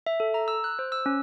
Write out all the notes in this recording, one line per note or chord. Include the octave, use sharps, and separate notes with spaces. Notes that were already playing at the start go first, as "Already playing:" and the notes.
E5
A4
A#5
E6
F#6
C5
E6
C#4